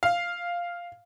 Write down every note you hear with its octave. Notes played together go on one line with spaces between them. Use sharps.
F5